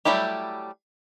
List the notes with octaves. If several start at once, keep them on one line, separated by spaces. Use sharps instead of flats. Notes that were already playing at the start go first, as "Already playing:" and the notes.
F#3 G3 A3 E4 G4